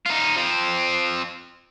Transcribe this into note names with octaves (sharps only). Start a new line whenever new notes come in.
D#4 F4
F3 C4